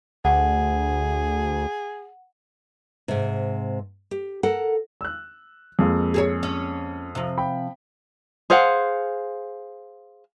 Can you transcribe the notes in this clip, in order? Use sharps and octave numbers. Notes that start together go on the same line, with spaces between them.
D2 G#4 F#5
G#2 C3
G4
A4 A#4 F#5
E6 F#6
F2 G#3 A#3
G#4 A4 C#5
C#4
C3 F3
G5 B5
G#4 C5 F5 F#5